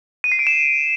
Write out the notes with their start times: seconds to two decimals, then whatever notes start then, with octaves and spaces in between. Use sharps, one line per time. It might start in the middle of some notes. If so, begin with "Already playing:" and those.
0.24 D#7
0.32 C7
0.39 D7
0.47 E7